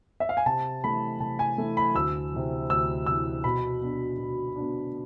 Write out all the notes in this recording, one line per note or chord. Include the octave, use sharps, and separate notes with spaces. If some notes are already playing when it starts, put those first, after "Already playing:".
E5
F5
G#5
C3 A5
E3 A3 B5
C3 A5
G#5
E3 A3
B5
D2 E6
C3 E3
D2 E6
C3 E3 E6
B2 B5
B3 D4
B2
B3 D4